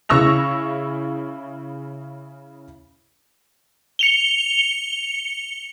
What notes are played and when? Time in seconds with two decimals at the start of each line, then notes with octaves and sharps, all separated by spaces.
0.09 C#3 E4 C#6 E6 A#6 F7
3.99 C#7 F7 G7